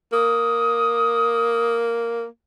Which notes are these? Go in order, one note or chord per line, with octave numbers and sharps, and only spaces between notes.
A#3 D#6